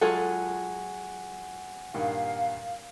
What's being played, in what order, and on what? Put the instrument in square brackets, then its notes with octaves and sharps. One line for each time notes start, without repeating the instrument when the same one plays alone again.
[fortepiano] F#3 G#3 [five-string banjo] F4 G#4 A4 [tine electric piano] F#5 G#5 C#6
[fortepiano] G2 A#2 D#3 [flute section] F5